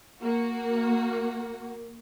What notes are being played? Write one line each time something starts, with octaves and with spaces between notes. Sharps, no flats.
A#3 F#4